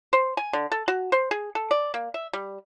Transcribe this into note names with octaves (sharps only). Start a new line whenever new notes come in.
C5
G#5
D3
A4
F#4
C5
G#4
A4
D5
A#3
E5
G3